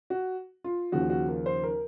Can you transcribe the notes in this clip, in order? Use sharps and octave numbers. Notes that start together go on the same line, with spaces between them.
F#4
F4
D#2 C#3 F3 F#4
F#4
A#4
C5
A#4